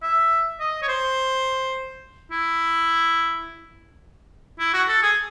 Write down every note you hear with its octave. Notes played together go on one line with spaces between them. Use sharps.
E5
D#5
C#5
C5
E4
E4
F#4
A4
G#4